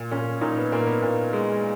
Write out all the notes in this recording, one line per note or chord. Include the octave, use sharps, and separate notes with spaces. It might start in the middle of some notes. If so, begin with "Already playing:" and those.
Already playing: A#2
A#2 C#4
A#2 D#4
B3
A#2 A#3
B3
A#2
G#3